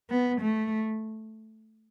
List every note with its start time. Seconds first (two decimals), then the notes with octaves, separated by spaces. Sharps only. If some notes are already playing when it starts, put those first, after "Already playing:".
0.10 B3
0.41 A3